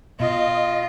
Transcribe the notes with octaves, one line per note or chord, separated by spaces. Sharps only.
B2 F4 D#5